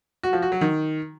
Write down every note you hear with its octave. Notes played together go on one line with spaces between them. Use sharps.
F#4
F3
F#4
F#3
D#3